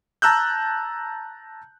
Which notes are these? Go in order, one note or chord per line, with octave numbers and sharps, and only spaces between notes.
A5 A#5 E6 F#6 G6